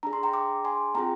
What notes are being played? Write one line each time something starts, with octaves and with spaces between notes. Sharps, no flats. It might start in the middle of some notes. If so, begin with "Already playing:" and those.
D4 G#4 A#5
C6
G5 A#5
A#5 D6
G#5 C6
C4 F4 G#4 G5 A#5